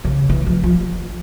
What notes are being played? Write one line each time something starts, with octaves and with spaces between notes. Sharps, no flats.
C#3
E3
F3
F3